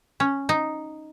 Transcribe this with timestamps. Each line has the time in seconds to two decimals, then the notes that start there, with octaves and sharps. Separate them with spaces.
0.20 C#4
0.49 D#4